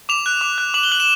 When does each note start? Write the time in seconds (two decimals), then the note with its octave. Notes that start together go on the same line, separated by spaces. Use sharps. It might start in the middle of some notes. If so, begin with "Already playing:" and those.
0.09 D6 F7
0.26 F#6
0.41 D6
0.58 F#6
0.74 D6 F#7
0.83 G7
0.92 F#6 F#7
1.00 E7